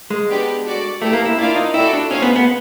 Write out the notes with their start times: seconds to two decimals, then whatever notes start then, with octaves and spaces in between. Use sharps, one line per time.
0.10 G#3
0.29 B3 D4 G4 B4
0.65 F#4 A4 D5
1.02 A3 E4 G4 B4
1.13 A#3
1.25 E4
1.38 D4 E4 F4 A#4 D5 F5
1.56 D#4
1.74 E4 F#4 A4 D5 G5
1.93 D4
2.11 C#4 D#4 G#4 C5 F5 G#5
2.22 B3
2.36 B3